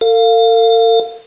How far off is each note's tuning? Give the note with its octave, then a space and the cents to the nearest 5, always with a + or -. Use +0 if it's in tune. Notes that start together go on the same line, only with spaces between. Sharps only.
A4 +45 F5 +0